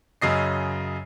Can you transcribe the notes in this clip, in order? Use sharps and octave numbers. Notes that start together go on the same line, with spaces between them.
F#2 C#3 D#5 C7